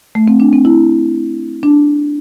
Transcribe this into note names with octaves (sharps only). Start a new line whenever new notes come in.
A3
C4
D4
C4
E4
D4